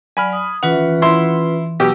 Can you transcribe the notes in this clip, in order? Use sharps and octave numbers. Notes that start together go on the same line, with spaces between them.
F#3 D5 G#5 B5 F6
D#6
E3 C#4 F4 B4 F#5
E4 C6
B2 F#3 G4 E6